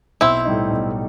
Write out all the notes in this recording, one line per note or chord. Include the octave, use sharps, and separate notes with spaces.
B1 C4 E4
A2 G3 D#4
B1